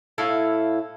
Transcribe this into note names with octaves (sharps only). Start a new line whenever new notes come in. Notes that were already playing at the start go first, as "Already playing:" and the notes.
A2 E4 A4 F5